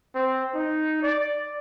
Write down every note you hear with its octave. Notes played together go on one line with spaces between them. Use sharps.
C4
D#4
D5